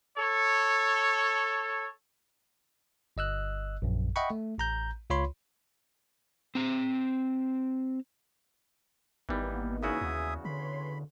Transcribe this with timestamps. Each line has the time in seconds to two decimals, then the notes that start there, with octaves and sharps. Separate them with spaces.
0.17 A4 C#5
3.17 G1 D#5 E6 F#6
3.82 A#1 F#2
4.16 D#5 E5 F#5 G5 B5 C#6
4.30 A3
4.58 A1 A#5 G6
5.10 C#2 F4 C#5 B5 C6
6.55 C4 A#5
9.29 G#1 E3 G3 A#3 B3 D#4
9.83 E2 C#3 F#4 G#4 E5 D#6
10.01 D#2
10.45 D3 B4 C#5 B5 C6